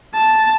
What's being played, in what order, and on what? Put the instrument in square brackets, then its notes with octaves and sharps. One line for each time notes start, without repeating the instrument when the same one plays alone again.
[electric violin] A5